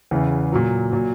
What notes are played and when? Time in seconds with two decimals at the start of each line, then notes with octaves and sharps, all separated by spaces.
0.11 E2 C#3 E3
0.52 A#2 F#3
0.93 A#2 F#3